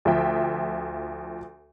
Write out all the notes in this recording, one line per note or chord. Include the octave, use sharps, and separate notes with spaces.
D2 F3 E5 G5